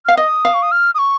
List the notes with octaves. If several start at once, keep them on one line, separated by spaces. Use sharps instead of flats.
F5 F6
D#5 D#6
F5
C#6
D#6
F6
D#6
C#6